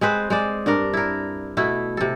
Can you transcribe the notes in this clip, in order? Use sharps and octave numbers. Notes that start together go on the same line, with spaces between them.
G#3 C4 B4 C5
G#3 C5 D5
G2 D4 A#4
E4 A#4
B2 A3 E4
C3 A4